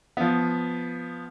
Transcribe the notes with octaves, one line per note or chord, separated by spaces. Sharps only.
F3 B3